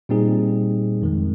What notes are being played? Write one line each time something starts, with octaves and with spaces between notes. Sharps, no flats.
A#2 G3 C4 D#4 G#4
F2 D#3 G#3